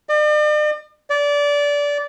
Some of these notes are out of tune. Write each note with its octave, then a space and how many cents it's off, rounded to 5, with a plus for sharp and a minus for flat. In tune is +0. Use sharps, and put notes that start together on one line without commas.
D5 +45
D5 -20